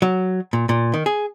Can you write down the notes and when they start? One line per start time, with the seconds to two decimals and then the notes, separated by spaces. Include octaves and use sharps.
0.02 F#3
0.53 A#2
0.69 A#2
0.94 D#3
1.06 G#4